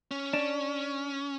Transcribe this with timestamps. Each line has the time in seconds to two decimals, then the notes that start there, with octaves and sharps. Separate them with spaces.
0.11 C#4
0.33 D4